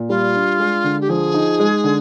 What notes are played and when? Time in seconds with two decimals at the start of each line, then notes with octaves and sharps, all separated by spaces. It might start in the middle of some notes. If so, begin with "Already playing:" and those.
Already playing: A#2
0.09 G3 F4
0.35 D4
0.59 G#3
0.84 D3
1.00 G4
1.09 F3 G#4
1.34 D#4
1.59 G#3
1.84 D3